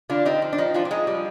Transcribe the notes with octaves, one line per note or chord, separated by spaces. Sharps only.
D3 D4 F4
C4 D#4 G4
F3
D4
F3 D#4
F3 D4 F4
D4
G#3 D#4
G3